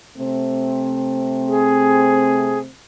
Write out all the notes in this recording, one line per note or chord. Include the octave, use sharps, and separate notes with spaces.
C3 A3 C4
G#4